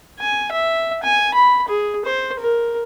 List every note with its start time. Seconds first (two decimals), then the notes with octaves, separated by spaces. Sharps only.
0.20 G#5
0.52 E5
1.03 G#5
1.34 B5
1.69 G#4
2.05 C5
2.40 A#4